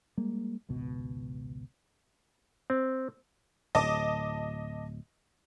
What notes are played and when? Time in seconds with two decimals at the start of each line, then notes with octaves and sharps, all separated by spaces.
0.18 G3 G#3 A#3
0.69 G#1 C#2 B2
2.70 C4
3.75 D1 D#5 A5 D6